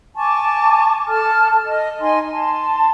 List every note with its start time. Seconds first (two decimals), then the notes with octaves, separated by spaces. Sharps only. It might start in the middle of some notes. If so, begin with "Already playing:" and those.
0.16 G#5 A5 C#6 D6
1.08 A4 A5 F6
1.66 D#5
2.00 D#4 D#5 G#5 C6
2.30 A5 C6